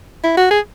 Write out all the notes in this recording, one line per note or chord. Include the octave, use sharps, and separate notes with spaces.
E4
F#4
G#4